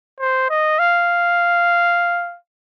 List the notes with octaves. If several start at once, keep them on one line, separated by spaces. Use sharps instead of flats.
C5
D#5
F5